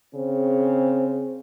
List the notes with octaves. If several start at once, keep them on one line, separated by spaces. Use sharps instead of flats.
C#3 C4